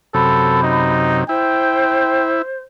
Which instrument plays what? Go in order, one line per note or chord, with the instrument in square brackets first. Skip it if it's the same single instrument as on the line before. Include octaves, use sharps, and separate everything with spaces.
[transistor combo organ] F#2 C3 [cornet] A4 [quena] B5
[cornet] D#4
[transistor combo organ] E4 [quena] C5 [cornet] G5